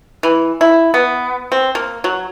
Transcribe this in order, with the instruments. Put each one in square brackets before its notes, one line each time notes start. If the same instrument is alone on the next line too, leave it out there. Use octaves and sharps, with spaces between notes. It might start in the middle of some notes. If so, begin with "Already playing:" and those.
[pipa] E3
E4
B3
C4
A#3
F#3